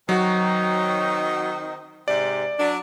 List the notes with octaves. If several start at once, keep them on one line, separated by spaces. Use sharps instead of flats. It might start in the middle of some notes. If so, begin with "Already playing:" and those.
D#3 F#3 C4 D#4 F#4
G#2 C3 D5
F#3 D4